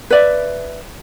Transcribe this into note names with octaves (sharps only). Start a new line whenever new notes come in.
B4 D5 E5